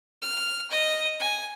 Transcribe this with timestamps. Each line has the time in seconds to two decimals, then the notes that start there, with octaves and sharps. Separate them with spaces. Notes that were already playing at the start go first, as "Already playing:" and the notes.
0.22 F6
0.71 D#5
1.20 G#5